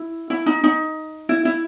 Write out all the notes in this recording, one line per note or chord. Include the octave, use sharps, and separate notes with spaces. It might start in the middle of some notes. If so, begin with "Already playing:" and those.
Already playing: E4
E4
D#4
D#4
E4
E4